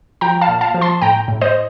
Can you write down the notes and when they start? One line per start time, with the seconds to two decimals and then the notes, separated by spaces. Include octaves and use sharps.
0.21 F3 G5 A#5
0.41 F5 A5
0.48 A#2
0.61 F5 A5
0.74 F3
0.81 A5 C6
1.02 A2 G5 A#5
1.28 A2
1.41 C5 D#5